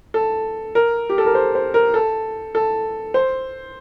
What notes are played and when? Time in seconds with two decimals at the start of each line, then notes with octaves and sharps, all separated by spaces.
0.14 A4
0.75 A#4
1.10 G4
1.18 A4
1.26 A#4
1.35 C5
1.55 C5
1.74 A#4
1.94 A4
2.55 A4
3.14 C5